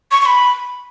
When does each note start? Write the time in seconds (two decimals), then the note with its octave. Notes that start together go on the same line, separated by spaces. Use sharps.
0.11 C#6
0.21 C#6
0.26 B5